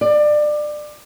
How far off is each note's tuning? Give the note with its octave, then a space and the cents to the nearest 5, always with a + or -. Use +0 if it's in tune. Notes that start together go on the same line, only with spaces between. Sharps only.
D5 +25